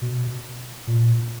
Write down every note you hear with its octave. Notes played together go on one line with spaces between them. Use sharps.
B2
A#2